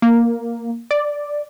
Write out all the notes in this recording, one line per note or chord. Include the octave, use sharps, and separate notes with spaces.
A#3
D5